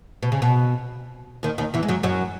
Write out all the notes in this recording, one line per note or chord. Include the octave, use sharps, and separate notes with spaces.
B2
C#3
B2
D#2 D#3
D#2 D#3
E2 E3
G#3
F#2 F#3
F#2 F#3